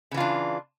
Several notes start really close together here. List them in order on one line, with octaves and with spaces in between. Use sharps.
C#3 E3 F4 D4